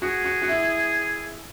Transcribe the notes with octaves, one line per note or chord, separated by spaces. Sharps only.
F#4 G#4
F#4
F#4
E4